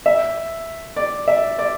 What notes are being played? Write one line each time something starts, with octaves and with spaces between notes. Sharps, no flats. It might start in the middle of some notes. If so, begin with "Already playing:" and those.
E5
D5
E5
D5